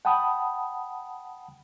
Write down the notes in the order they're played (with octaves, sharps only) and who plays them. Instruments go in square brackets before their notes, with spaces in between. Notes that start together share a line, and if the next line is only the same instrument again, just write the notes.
[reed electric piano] F#5 G5 A5 B5 D#6